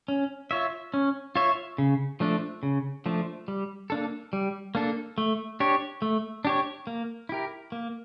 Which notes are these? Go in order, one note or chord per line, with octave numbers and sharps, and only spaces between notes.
C#4
F4 C#5 E5
C#4
F4 C#5 E5
C#3
F3 A3 D4
C#3
F3 A3 D4
G3
A#3 D4 A4
G3
A#3 D4 A4
A3
D4 G4 C#5
A3
D4 G4 C#5
A#3
E4 G4 A#4
A#3